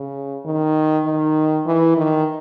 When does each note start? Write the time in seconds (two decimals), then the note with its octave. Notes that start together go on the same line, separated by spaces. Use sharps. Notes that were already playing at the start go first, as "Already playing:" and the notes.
Already playing: C#3
0.45 D#3
1.05 D#3
1.66 E3
1.97 D#3